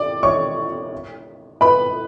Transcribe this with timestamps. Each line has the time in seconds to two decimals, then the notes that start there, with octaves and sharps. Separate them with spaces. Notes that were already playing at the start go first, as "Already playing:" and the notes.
Already playing: D5 D6
0.23 C#5 C#6
1.61 B4 B5